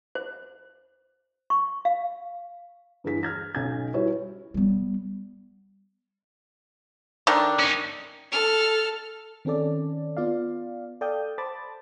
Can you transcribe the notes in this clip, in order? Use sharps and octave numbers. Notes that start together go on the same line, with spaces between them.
C5
C#6
F5
G2 E3 G#4 B6
F6 G#6 A#6
B1 C#4 G#6
G3 E4 F#4 B4 C#5
G3 B3
D#3 A3 D4
C#4 D#4
A4 F6
D#3 C4 C#4 A4 D5
B3 F4 D5 F5
A4 D5 F5 G5 D#6 G6
C5 A5 B5 D6 A6